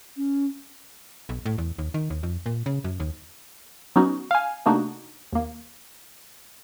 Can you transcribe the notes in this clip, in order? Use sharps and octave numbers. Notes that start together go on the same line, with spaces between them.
C#4
B1
A2
E2
D#2
D#3
D#2
F2
A#2
C#3
F#2
D#2
F#3 B3 C#4 D#4 F#4
F5 G#5
C3 A3 A#3 D4 D#4 F#4
D#2 A#3